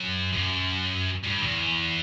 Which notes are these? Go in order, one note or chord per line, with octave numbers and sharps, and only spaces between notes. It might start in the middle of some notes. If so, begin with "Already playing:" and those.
Already playing: F#2
F#2
G2
E2